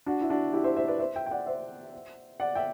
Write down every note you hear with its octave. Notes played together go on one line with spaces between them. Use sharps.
D4 F#4
E4
D4 F#4
E4 G4
C5 E5
C5 E5
B4 D5
C5 E5
E5 G5
G5
D5 F#5
C5 E5
D5 F#5
E5 G5